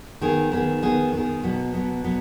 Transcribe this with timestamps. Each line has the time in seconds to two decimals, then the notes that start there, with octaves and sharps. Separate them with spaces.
0.21 D#3 B3 G#4
0.52 D#3 B3 G#4
0.83 D#3 B3 G#4
1.13 D#3 B3 G#4
1.44 B2 F#3 B3
1.74 B2 F#3 B3
2.04 B2 F#3 B3